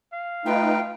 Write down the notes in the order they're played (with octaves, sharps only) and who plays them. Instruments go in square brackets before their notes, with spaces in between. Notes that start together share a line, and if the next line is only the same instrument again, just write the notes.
[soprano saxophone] F5
[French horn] A3 [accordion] D#4 F4 B4 [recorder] G5